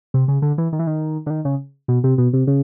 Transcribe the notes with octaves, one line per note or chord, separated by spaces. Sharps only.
C3
C#3
D3
E3
D#3
E3
D#3
D3
D#3
C#3
B2
C3
B2
C3
C#3